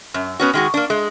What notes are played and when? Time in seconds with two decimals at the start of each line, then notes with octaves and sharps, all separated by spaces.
0.14 F#2
0.40 B3 C#4 F#4
0.53 D#3 G#3 F#4
0.74 A#3 D4
0.90 G#3